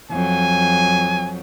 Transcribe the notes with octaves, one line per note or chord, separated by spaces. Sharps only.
F2 F#3 G#5